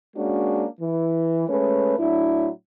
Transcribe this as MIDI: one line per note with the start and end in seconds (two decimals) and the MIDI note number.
0.16 0.66 56
0.16 0.66 58
0.16 0.66 61
0.16 0.66 62
0.16 0.66 66
0.81 1.46 52
1.49 1.95 56
1.49 1.95 57
1.49 1.95 61
1.49 1.95 71
1.49 1.95 73
1.99 2.50 45
1.99 2.50 54
1.99 2.50 62
1.99 2.50 64